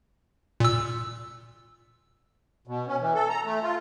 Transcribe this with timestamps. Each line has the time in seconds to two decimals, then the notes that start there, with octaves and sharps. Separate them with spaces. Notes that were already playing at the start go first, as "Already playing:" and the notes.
0.60 A#2 E6
2.67 B2
2.87 C#4
3.00 E3
3.15 A4
3.29 A#5
3.45 A3
3.63 F4